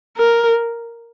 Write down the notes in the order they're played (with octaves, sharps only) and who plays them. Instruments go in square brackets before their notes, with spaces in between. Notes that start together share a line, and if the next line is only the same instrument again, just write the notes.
[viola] A#4